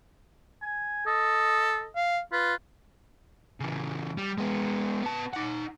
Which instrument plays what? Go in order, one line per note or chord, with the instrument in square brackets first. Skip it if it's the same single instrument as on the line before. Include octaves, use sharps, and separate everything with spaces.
[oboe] G#5
[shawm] A4 [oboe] D#5
[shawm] F5
[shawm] F4 [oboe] B4
[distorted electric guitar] C#3 E3
G3
G#3 B3
B3 A5
D#4 F#5